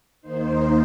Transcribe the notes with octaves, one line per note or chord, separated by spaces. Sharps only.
D#2 D#3 A#3 D#4 C5